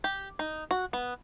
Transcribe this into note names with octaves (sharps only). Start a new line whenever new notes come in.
G4
D#4
F#4
B3